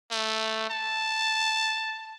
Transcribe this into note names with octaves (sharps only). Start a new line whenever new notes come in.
A3
A5